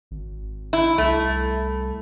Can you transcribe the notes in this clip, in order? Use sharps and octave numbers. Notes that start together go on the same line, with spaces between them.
G#1
E4
C2 A3